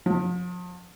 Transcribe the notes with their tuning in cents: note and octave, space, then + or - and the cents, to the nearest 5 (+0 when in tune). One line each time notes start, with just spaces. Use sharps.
F3 +40